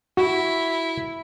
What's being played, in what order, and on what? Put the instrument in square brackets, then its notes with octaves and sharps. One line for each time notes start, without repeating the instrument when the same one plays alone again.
[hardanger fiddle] E4 [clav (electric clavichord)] F#4